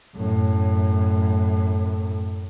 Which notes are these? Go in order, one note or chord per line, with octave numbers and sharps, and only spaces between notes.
F#2 A2